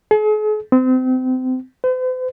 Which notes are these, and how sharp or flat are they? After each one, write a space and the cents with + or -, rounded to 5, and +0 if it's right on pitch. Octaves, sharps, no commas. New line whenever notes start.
G#4 +45
C4 -30
C5 -45